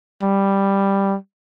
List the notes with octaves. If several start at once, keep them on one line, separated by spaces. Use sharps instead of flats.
G3